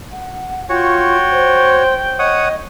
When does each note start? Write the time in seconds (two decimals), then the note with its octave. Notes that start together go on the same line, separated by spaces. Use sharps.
0.13 F#5
0.69 F4 F#4 C#5 G5
1.32 C5
2.19 C#5 D#5 F#5 D#6